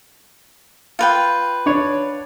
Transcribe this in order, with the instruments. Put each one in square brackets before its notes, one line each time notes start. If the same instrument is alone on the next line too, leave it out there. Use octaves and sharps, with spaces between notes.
[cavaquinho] F4 B4 G5
[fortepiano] D4 C#5